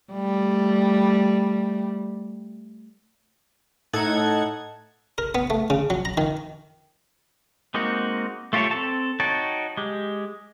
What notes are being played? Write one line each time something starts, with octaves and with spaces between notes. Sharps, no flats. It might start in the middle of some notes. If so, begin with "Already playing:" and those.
G3 A3
A2 D#4 A4 F#5 G#6
A#4
B3
A3
C#3
F#3
A#5
D#3
G#3 A#3 C4 D#4 F#4
A3 F4 G4 A4 C#5
C4 A4 A5
D#4 F#4 C#5 G5 A5
G#3 G4